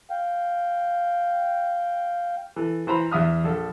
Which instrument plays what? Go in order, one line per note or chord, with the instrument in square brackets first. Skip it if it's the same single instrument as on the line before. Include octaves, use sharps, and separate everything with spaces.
[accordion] F5 G5
[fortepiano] E3 A4
E3 C5 A#5 B5
E2 E5 D#6 F6
A#1 A4